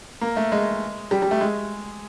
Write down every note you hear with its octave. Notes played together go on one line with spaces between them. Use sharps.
A#3
A3
G#3
G3
G3
A3
G#3